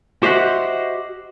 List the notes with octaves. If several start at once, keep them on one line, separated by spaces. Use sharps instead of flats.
F#4 G4 C5 D#5 E5 F#5